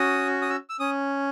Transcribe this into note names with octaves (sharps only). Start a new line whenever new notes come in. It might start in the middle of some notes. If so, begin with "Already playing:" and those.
Already playing: C#4 F#4 D#6
D#6
E6
E6
C#4 D#6